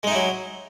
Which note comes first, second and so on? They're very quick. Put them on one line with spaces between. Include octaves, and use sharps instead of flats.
G#3 D#4 E4 F#3